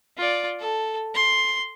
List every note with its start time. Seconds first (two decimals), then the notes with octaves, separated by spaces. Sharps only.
0.18 F4 D5
0.60 A4
1.14 C6